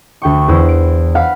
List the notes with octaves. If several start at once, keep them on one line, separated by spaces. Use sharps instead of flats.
D2 G5 C#6
E2 E3 E4 C5
D7
F5 F#5 B5 F6 B6